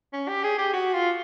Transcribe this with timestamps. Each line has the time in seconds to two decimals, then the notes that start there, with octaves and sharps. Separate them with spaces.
0.13 C#4
0.28 G4
0.44 G#4
0.58 G4
0.73 F#4
0.93 F4